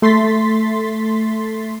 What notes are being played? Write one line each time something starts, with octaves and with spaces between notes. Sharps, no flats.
A3 C6 A6 B6